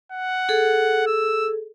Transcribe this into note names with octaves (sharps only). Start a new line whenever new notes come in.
F#5
G#4 A4
E6